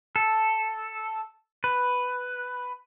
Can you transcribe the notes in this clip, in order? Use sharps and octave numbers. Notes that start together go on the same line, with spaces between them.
A4
B4